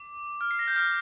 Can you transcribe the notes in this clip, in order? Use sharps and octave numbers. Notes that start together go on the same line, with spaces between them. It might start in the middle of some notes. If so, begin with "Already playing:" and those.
Already playing: D6
F6
C7
A#6
G6
F6